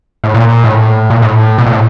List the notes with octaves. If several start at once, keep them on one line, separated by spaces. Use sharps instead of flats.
A2
A#2
A2
A#2
A2
B2
A#2
A2